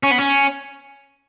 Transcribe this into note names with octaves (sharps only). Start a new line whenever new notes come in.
C#4
B3
C#4